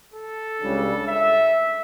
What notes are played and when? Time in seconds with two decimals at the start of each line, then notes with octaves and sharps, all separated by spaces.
0.14 A4
0.61 C#2 C#3 G3 D4
1.07 E5